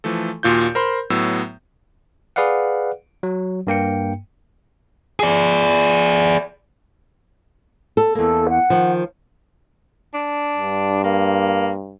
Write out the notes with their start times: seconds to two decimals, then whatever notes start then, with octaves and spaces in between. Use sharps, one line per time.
0.04 E3 F3 A3 A4
0.43 D#2 A#2 F4 F#4 G6
0.75 A#4 C5 B5 C6
1.10 A2 F#3 B3 E6
2.36 G#4 B4 D5 F5 F#5
3.23 F#3
3.67 G2 A#3 G5 C#7
5.19 G#4 D5
7.97 A4
8.15 E2 A#3 A4
8.49 F#5
8.70 D#3 F3
10.14 D4
10.57 G2
11.04 A#3